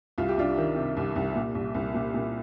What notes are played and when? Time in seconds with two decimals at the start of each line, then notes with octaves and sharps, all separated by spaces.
0.18 C2 F4
0.29 G4
0.37 C2 D4 F4
0.58 D#3
0.76 C3
0.97 C2
1.16 C2
1.35 A#2
1.55 C2
1.75 C2
1.94 A#2
2.14 A#2